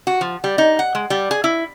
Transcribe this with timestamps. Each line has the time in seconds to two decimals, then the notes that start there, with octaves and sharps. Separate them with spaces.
0.07 F#4
0.21 F3
0.44 G3
0.58 D#4
0.79 F#5
0.95 G#3
1.10 G3
1.31 G#4
1.44 E4